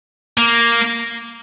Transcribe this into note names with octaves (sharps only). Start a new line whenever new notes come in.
A#3